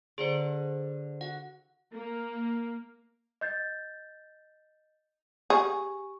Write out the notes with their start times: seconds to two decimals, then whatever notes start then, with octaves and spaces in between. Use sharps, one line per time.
0.18 D3 G#4 A#4 C5 C6
1.21 F#4 F#5
1.93 A#3
3.41 D#5 G6 A6
5.50 G4 G#4 G#5 C#6